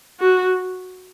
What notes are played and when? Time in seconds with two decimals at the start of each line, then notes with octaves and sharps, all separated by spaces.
0.20 F#4